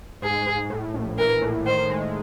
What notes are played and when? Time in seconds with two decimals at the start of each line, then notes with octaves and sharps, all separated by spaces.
0.22 G#2 G#4
0.46 G#2
0.70 A2
0.94 A#1
1.18 E3 A#4
1.42 A2
1.66 D#3 C5
1.90 G#3